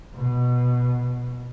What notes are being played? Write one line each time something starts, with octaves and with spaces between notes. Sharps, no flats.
B2